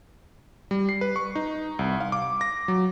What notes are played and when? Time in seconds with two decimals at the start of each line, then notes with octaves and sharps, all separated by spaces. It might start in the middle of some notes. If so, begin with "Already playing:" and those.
0.71 G3
0.89 C7
1.01 B4
1.16 C#6
1.35 D#4
1.79 C2
2.01 F5
2.12 D6
2.41 A#6
2.68 F#3